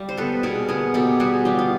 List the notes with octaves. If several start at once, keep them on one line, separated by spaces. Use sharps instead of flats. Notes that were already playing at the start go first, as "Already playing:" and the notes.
Already playing: G3 F4 G4
C5
B3 A4 B4
B2 G#4 A#4
B3 G#4 A#4
B2 G4 A4
G3 F#4 G#4
G3 F4 G4
F4